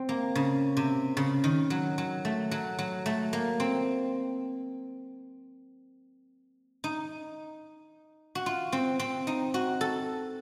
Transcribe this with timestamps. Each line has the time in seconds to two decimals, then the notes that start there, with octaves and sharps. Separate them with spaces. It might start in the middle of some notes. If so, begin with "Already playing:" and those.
Already playing: C4
0.09 A#3
0.35 C#3
0.77 C3
1.17 C#3
1.44 D#3
1.70 F#3
1.98 F#3
2.25 A3
2.51 F#3
2.79 F#3
3.06 A3
3.33 A#3
3.60 C4
6.84 D#4
8.35 F#4
8.46 F4
8.72 C4
9.00 C4
9.27 D#4
9.54 F#4
9.81 A4